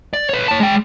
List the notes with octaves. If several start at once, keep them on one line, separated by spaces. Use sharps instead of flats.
D5
B4 C#5
C#5 A5
G#3 G5